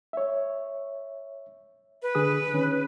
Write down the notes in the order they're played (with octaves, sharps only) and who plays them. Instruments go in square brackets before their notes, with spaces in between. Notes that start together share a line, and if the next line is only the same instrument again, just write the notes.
[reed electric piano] C#5 E5
[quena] B4
[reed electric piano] D3 G#4 D#6
D#3 C#4